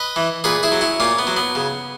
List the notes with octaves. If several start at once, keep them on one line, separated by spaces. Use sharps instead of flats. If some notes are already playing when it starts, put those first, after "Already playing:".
Already playing: B4 D#5
E3
A#2 G#4 B4
E4 G#4
F#3
C#4 E4
A#2 A#3 C#4
B3
F#3
B3
C#3